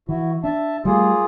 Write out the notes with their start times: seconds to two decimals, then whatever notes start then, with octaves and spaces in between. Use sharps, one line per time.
0.09 E3 E4 F#4
0.44 D4 E5 A5
0.85 G3 A3 A#3 F4 G#4